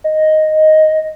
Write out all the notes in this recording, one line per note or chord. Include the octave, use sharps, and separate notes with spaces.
D#5